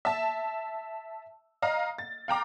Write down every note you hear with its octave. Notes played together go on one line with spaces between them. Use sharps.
E5 A5
D#5 F5 A#5
A6
F5 G5 A#5 D6